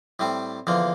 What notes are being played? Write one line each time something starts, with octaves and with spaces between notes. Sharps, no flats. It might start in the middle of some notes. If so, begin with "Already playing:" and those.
A2 G3 C4
E2 D3 F3 A#3